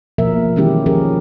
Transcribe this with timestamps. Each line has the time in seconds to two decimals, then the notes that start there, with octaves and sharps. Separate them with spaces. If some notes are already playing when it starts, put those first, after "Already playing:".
0.18 B2 F3 A#3 A#4 E5
0.56 D#3 E3 G#3 C#4 E4 G4
0.86 F3 C#4 G4 G#4 A#4